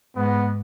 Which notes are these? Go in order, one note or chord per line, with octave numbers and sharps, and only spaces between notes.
G#2 B3